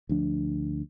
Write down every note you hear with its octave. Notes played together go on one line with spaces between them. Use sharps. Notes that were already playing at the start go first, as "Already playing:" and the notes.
D2 F3 D4